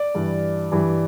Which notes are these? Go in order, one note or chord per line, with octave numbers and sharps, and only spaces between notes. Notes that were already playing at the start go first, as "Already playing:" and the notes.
Already playing: D5
G2 E3 G3
G2 E3 G3